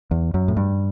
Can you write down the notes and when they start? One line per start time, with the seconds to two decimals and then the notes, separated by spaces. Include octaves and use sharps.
0.11 E2
0.34 F#2
0.48 A2
0.57 G2